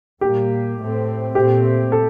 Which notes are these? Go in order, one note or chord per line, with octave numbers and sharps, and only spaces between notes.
A#2 G3 A#3 G4
A2 A3 C4
A#2 A3 C4 G4
A4